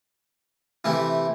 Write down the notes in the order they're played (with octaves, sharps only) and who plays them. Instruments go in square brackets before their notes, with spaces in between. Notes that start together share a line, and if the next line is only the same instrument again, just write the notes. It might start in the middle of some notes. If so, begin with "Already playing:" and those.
[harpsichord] C3 E3 A3 E4 G4